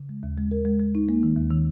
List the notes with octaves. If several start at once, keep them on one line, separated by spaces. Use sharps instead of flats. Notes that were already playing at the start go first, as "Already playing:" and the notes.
Already playing: C#3
G#3
D#2
G#3
A#4
G#3
G#3
D#4
A#3
D#3
D#2
D#3